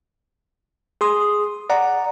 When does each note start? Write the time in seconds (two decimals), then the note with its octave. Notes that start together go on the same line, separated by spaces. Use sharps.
1.01 G#4 C6 D#6
1.70 D5 F#5 A#5